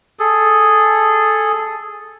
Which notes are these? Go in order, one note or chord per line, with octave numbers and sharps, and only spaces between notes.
G#4 A4